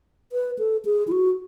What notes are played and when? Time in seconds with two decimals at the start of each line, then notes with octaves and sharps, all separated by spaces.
0.32 B4
0.59 A4
0.85 G#4
1.08 E4
1.12 F#4